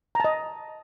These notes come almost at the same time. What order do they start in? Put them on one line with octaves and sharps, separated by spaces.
A#5 A5 D#5